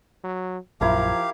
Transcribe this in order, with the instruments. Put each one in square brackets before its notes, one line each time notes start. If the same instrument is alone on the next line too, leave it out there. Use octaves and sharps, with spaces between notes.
[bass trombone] F#3
[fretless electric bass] A#1 F#2 [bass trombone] F3 [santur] E4 A#4 A#5 [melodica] G4 F5